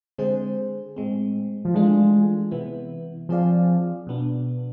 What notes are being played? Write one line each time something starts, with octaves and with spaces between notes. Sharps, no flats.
D3 G#3 C4 G#4 C5
A2 G#3 C4
F3
E3 G#3 A3 D4 F4
C3 E3 B3 E4
F3 C4 G#4 D5 F5
B2 B3 D4